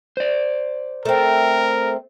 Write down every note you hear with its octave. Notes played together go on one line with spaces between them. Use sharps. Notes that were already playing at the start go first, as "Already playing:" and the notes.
C5 D5
A3 C4 A#4